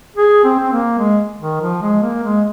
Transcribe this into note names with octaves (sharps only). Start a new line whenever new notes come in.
G#4
C4
C4
A#3
G#3
D#3
F3
G#3
A#3
G#3